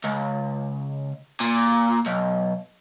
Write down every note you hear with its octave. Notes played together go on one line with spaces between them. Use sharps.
C#2
A#2
B1